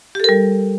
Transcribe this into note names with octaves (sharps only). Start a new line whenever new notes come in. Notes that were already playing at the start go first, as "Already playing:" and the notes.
G3 G4 A4 A#4